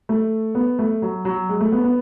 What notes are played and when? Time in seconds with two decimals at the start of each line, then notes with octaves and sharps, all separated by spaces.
0.09 A3
0.55 B3
0.79 A3
1.02 F#3
1.25 F#3
1.49 G#3
1.61 A3
1.72 B3
1.84 B3